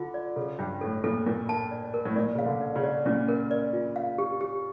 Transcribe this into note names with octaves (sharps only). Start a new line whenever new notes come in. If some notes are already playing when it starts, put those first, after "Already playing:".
Already playing: D3 F4
D5
C#3 A4
G2 G5
A2 A4
A#2 A4
A#2 A#4
A5
D5
A#4
A2
A#2 D5
C#3 F5
D3
D5
C#3
D5
A#2 C#4
A#4
D5
F4
F5
G4
G4